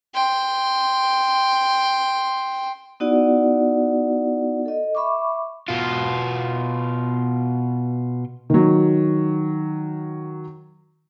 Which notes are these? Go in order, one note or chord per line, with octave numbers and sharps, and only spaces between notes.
G5 C6
B3 D#4 E4 F#4 D5 F#5
A4 D#5
E5 B5 C#6 D6
B2 F4
D#3 F#3